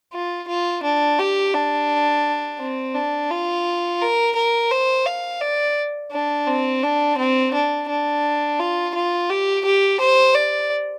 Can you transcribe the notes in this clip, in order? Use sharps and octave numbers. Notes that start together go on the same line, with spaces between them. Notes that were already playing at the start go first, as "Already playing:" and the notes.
F4
F4
D4
G4
D4
C4
D4
F4
A#4
A#4
C5
F5
D5
D4
C4
D4
C4
D4
D4
F4
F4
G4
G4
C5
D5